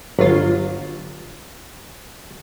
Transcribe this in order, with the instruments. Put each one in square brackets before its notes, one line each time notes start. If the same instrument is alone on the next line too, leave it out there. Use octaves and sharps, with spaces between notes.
[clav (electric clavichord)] G1 [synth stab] F#3 F4